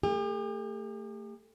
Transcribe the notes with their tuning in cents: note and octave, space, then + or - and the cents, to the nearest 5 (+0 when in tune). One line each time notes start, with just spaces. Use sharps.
A3 +25 G4 +45